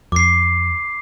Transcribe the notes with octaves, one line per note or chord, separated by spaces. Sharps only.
F2 D6 C7